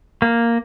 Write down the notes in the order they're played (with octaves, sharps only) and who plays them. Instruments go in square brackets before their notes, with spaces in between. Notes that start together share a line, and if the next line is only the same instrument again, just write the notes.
[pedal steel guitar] A#3